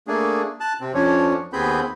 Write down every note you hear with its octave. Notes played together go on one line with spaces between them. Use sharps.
A3 A#3 D4 G#4
A5 F#6
C3 C4
F2 F3 C#4 D4 C#5
D#2 B3 C4 G#4 B5 G6